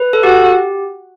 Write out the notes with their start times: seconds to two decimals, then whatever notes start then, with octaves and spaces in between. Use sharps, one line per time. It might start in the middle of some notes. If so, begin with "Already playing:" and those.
Already playing: B4
0.13 A4
0.23 F#4 G4